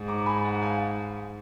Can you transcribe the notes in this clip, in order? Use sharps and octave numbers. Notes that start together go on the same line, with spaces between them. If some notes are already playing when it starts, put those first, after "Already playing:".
Already playing: G#2
A#5 D6
G#5 B5
F#5 A#5
F5 G#5